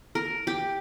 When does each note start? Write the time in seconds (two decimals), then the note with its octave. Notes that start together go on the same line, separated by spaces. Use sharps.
0.15 A#4
0.47 G4